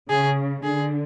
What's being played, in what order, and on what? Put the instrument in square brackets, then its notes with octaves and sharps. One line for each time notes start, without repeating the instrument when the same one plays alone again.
[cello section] C#3 [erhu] G#4
[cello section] D3 [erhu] G#4